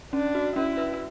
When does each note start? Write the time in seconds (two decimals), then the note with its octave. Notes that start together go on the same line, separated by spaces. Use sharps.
0.13 C#4 D4
0.35 F#4
0.56 C#4 E4
0.77 B4